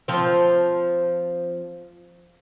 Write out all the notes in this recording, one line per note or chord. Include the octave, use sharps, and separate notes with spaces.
F3 C4